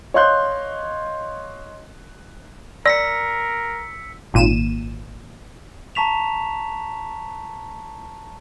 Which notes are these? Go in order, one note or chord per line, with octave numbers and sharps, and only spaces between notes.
C#5 D#5 F5 C6 F#6 G6
A#4 D5 E6 B6 C#7
G#1 A#2 D#7 E7
A5 A#5 C#6 B6 E7 F7